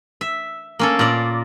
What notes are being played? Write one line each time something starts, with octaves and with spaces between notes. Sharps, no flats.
E5
A#3 C#4 A4
A#2 D5